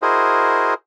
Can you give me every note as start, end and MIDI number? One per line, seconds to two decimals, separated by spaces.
0.02 0.74 64
0.02 0.74 66
0.02 0.74 68
0.02 0.74 70
0.02 0.74 72
0.02 0.74 75